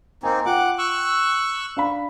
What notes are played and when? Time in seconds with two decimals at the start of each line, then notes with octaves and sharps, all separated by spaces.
0.23 A#3 C4 D#4 G#5
0.46 F4 F#5 G5 D6
0.78 C#6 E6 F#6
1.77 D4 F5 B5